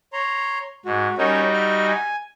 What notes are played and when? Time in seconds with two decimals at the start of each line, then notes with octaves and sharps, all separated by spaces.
0.13 C#5 A#5 C6
0.85 G#2 F#4
1.18 G3 C#4 D#4 F#4 A#4 C#5
1.53 E5 F6
1.87 G#5